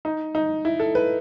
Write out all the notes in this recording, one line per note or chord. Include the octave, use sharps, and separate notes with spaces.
D#4
D#4
E4
A4
B4